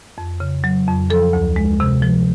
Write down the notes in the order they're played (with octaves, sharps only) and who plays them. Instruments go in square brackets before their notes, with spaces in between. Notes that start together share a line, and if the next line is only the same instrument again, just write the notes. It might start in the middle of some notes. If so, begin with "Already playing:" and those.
[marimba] F2
C#3
F#3
F2
F3 A4
D2
G#3
C3
F3